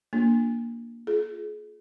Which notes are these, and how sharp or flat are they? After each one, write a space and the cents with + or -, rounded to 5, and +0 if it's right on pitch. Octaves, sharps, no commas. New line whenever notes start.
A#3 +5 D4 +0 F4 +0
F4 +0 G#4 +30